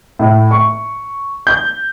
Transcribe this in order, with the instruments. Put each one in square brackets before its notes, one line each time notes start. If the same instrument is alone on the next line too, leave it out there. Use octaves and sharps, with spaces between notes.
[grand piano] A2
C#6
G6